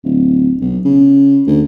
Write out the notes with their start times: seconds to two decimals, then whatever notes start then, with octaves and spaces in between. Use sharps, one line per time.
0.04 D1
0.61 B1
0.85 C#3
1.47 D2